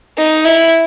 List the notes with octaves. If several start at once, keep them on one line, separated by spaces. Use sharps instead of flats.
D#4
E4